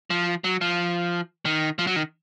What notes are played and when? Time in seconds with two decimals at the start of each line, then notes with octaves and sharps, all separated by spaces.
0.10 F3
0.44 F#3
0.61 F3
1.45 D#3
1.79 F3
1.87 F#3
1.96 D#3